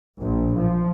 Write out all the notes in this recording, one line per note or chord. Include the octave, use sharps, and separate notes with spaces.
A#1
F3